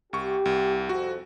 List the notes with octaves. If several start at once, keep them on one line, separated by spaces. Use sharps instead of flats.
C2 G4 C#6
C2
F2 F#4